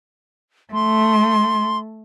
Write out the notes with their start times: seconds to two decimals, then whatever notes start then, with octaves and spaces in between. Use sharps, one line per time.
0.73 A3 C6